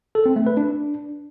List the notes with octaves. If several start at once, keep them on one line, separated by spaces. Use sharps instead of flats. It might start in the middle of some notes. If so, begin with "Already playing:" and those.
A4
C4
A3
B4
D4